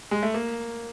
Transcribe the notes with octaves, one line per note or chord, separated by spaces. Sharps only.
G#3
A3
A#3